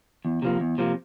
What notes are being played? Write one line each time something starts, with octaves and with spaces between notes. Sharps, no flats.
E2
C3 F3 A#3
E2
C3 F3 A#3